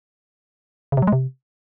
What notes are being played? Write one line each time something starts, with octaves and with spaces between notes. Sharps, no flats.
C#3
C3
F#3
G#3
C3